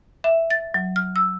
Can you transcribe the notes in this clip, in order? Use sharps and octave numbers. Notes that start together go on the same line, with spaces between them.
E5
A6
F#3
F6
E6